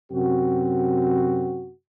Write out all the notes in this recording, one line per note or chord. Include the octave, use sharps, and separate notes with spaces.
F#2 C3 C4 F#4